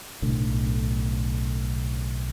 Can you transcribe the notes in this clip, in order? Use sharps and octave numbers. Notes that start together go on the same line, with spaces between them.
B1 A2 D3